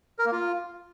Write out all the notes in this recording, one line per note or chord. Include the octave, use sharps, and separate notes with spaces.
A#4
A#3
F4